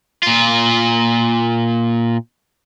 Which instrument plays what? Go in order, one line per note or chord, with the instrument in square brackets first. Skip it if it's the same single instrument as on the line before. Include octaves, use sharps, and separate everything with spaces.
[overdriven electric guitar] A#2 F4